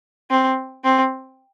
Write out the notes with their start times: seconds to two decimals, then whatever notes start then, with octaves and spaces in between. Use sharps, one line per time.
0.31 C4
0.84 C4